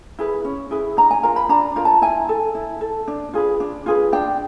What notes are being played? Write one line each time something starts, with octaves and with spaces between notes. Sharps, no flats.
E4 G#4 B4
C#4
E4 G#4 B4
D4 A#5
G#5
F4 A#4 A#5
B5
D4 A#5
F4 A#4 A#5
A5
E4 G#5
A4
E4
A4
D4
F4 G#4 B4
D4
F4 G#4 B4
D4 G5